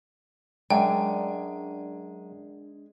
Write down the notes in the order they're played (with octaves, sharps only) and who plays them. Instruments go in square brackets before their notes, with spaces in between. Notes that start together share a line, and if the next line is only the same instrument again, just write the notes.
[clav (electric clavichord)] F#2 [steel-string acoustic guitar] G#3 [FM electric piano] D4 [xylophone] G5